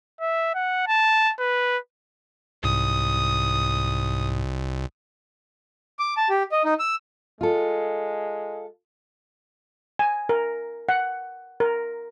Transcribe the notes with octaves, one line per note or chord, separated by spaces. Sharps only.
E5
F#5
A5
B4
C2 G#2 D#6
D6
A5
G4
D#5
D#4
E6
G#3 F4 A4
G#5
A#4
F#5
A#4